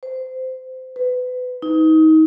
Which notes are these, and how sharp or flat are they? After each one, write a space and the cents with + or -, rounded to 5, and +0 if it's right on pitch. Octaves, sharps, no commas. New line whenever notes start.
C5 -20
B4 +25
D#4 +25